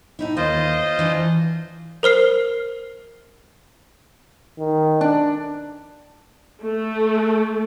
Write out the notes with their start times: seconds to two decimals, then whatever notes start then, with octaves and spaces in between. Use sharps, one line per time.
0.19 A2 D#4 E4
0.37 D#2 F4 C5 D#5
0.99 E3 D4 E4
2.03 A#4 C5 F6 C7
4.59 D#3
5.01 D4
6.61 A3